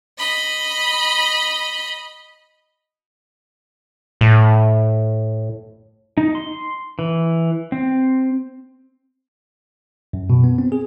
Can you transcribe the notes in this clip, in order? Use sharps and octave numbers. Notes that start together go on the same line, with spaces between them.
D#5 B5
A2
D#4
C6
E3
C4
F#2
B2
B3
C4
G#4